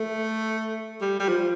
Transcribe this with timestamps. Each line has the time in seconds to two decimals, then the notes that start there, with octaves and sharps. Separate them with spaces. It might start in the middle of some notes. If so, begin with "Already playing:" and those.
Already playing: A3
1.01 G3
1.20 G3
1.28 F3